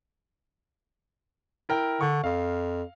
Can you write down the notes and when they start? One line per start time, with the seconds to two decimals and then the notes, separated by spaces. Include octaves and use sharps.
1.69 E4 A#4 G5
2.01 D3 C#6
2.24 F2 F5